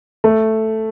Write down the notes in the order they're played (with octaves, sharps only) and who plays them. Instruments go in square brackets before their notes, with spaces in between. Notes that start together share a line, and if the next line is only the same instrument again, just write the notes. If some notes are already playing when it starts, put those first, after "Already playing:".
[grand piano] A3